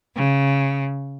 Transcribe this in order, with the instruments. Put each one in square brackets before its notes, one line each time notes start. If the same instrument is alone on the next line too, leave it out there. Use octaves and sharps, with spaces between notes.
[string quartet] C#3